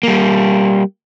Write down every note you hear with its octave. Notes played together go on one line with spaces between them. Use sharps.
G3 A#3